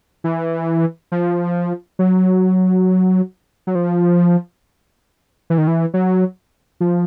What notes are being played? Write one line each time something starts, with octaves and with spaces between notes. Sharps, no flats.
E3
F3
F#3
F#3
F3
E3
D#3
E3
F#3
F3